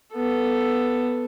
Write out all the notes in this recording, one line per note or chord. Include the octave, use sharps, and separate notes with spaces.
B3 A4